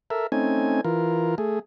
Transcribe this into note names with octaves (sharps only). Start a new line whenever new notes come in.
A4 A#4 E5
A3 C4 C#4 D#4 G#5
E3 F4 A#4
A3 G#4